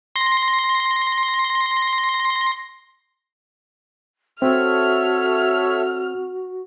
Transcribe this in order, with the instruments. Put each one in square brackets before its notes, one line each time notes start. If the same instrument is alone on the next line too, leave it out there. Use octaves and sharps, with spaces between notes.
[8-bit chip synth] C6 A#6
[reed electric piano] C4 [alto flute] F#4 [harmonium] A4 C#5 E5 [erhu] F6